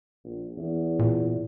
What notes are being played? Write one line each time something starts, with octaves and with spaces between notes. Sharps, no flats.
A#1
E2
A#2